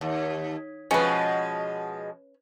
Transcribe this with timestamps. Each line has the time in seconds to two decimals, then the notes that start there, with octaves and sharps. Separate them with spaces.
0.01 D#2
0.91 B2 F3 G#3 C#4 B4